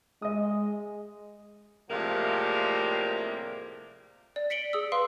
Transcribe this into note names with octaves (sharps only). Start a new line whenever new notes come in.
G#3 D#5 D#6
A2 C3 F3 G3 G#3 A#3
D5
B6 C#7 D7 F#7 G7
G#4 D#6 E6
B4 F5 C6